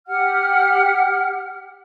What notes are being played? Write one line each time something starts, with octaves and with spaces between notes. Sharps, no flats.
G4 F#5 F6